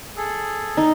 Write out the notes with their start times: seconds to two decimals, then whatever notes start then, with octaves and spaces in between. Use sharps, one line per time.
0.17 G#4 A4
0.77 D#4